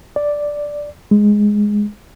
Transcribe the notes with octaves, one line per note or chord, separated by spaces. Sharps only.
D5
G#3